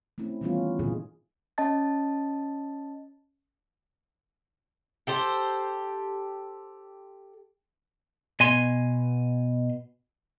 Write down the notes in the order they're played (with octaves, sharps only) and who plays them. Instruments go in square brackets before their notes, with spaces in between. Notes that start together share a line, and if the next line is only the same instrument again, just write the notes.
[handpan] A3 C4 C#4 E4
D#3 E3 G3 B3 C#4 F4
A#2 D3 D#3 D#4 G#4
[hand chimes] C#4 D#5 A5 A6
[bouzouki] G4 A4 C5
[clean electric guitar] B2 G#5 C6